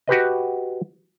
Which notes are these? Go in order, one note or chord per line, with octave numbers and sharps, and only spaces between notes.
F#4 G4 B4 D#5